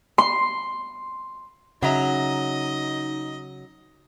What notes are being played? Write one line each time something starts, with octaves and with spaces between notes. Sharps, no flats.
C6
C#3 F#3 D#4 D#5 E5 A#5